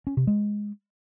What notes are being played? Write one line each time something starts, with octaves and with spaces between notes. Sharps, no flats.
C#4
C3
G#3